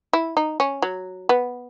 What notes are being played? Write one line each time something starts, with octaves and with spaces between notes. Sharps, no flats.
E4
D#4
C#4
F#3
B3